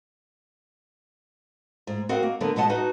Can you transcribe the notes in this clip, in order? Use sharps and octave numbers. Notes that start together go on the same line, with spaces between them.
G#2
C4 F#4 A#4 D#5 F5 F#5
A#3
D3 F#3 B3 A#4
B2 F#3 G#3 D#5 F#5 A5
D#4 F#4 B4 D#5